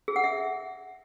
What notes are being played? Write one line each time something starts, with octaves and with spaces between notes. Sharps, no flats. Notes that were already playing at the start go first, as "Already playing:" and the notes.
G#4
F#5
E5